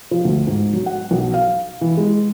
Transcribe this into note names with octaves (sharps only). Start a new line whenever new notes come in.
F3
D2
G#2
F#3
F#5
B1
F5
E3
G#3